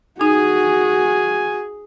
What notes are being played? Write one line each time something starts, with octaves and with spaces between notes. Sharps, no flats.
D#4 F#4 G#4 G#5